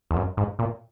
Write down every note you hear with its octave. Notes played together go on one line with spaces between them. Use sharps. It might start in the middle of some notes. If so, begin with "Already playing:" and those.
E2
F#2
G#2
A#2